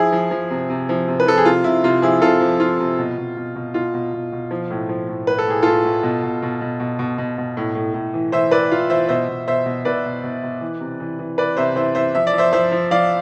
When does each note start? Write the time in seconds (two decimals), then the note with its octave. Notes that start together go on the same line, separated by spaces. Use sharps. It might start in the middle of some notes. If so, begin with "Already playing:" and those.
Already playing: F3 E4 G#4
0.12 F3
0.31 F3
0.50 C3
0.70 C3
0.89 F3
1.08 C3
1.20 B4
1.27 F3 A4
1.38 G#4
1.45 C3 F4
1.64 C3 E4
1.84 C3 F4
2.02 F3 E4 G#4
2.22 C3 F4 A4
2.41 F3
2.60 F3 F4
2.80 C3
2.99 B2
3.18 B2
3.37 B2
3.55 B2
3.74 B2 F4
3.94 B2
4.13 B2
4.32 B2
4.51 F3
4.70 A2
4.89 F3
5.09 A2
5.27 A2 B4
5.39 A4
5.47 A2 G#4
5.62 A2 F4 A4
5.84 A2
6.03 B2
6.23 B2
6.42 B2
6.61 B2
6.80 B2
6.99 B2
7.18 B2
7.38 B2
7.57 A2
7.75 A2
7.94 A2
8.14 E3
8.32 E3 C5 E5
8.51 E3 B4 D5
8.71 E3 F4
8.90 E3 C5 E5
9.09 B2 C5 E5
9.28 B2
9.47 B2 C5 E5
9.66 B2
9.85 B2 B4 D5
10.05 B2
10.23 B2
10.43 B2
10.61 E3
10.80 C3
11.00 E3
11.19 E3
11.38 E3 B4 D5
11.57 C3 C5 E5
11.76 E3 C5 E5
11.95 E3 C5 E5
12.15 F3 E5
12.27 D5
12.33 F3
12.38 C5 E5
12.53 F3 C5 E5
12.72 F3
12.91 F3 D5 F5